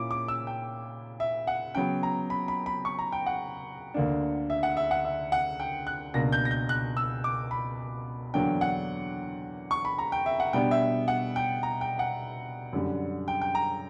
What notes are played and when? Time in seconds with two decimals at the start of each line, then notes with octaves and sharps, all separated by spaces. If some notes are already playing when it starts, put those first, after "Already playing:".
Already playing: A#2 A#3 C#4 E4 D6
0.11 D6
0.28 E6
0.47 G5
1.20 E5
1.47 F#5
1.75 C#3 F#3 B3 G5
2.03 A#5
2.30 B5
2.48 B5
2.66 B5
2.85 C#6
2.99 A#5
3.12 G5
3.26 F#5
3.94 D2 D3 A#3 D4
4.50 E5
4.63 F#5
4.77 E5
4.91 F#5
5.05 E5
5.32 F#5
5.60 G5
5.87 F#6
6.14 C#2 B2 A#3 D4 A#6
6.32 G6
6.45 A#6
6.51 G6
6.69 F#6
6.97 E6
7.24 D6
7.51 B5
8.33 E2 D3 F#3 A#3 D4 G5
8.61 F#5
9.71 C#6
9.85 B5
9.98 A#5
10.12 G5
10.26 E5
10.40 F#5
10.53 B2 G3 B3 D4 G5
10.71 E5
11.08 F#5
11.36 G5
11.63 A#5
11.81 G5
11.99 F#5
12.73 F#2 D3 G3
13.28 G5
13.42 G5
13.55 A#5